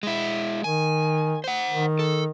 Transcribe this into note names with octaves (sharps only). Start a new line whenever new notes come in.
G#3 E4
D#3 G#5
C5 F#5
D#3
A4